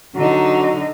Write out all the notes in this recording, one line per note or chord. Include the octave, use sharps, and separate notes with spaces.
D3 F#3 D#4